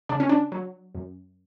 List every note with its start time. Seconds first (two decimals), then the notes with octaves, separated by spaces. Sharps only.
0.09 C#3 D4
0.20 C#4
0.29 D4
0.52 F#3
0.95 F#2